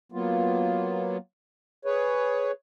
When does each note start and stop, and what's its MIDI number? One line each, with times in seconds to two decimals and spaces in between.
0.12 1.17 54
0.12 1.17 58
0.12 1.17 59
0.12 1.17 65
1.85 2.51 68
1.85 2.51 71
1.85 2.51 73